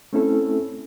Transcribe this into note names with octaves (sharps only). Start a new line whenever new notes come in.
A3 C4 C#4 E4 A4